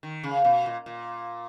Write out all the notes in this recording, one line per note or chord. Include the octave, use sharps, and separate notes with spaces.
D#3
C#3
B2
A#2
A#2